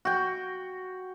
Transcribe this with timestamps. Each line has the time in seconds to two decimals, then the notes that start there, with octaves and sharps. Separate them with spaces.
0.05 F#4 G5